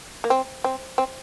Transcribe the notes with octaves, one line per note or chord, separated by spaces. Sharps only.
A#3
C4
C4
C4